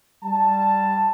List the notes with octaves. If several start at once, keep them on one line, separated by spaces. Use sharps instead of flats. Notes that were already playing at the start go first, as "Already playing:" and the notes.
G3 A5